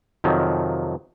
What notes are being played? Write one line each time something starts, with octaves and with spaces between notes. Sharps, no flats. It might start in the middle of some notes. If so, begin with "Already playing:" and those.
F2 C3 D#3 F3 F#3